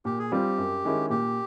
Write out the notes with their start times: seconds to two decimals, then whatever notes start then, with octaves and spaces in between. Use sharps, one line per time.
0.05 A#2 G4
0.19 G#4
0.32 G3 C4 F4 G4
0.58 F#2
0.85 D#3 G#3 C#4 E4
1.10 A#2 G4